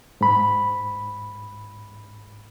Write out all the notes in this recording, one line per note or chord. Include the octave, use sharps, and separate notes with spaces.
G#2 B5